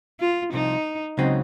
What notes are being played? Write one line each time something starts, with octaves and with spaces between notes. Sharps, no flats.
F4
C2 C3 F3 D#4
C#2 C#3 F#3 C4 D#4